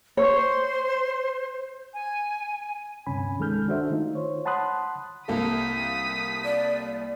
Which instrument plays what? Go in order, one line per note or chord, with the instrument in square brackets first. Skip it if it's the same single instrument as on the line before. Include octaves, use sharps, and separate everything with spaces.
[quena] C5 [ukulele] C#5
[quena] G#5
[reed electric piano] D2 G2 C3 C#4 G#5 B5
C2 D#3 G#3 A4 F6 G6
D4 F#4 A4 C5 E5
D#3 A3 D#4 F4
C5 C#5
F#5 A5 B5 C6 D#6 F#6
[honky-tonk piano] C2 A#3 A4 [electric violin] D#6 B6
[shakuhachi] D5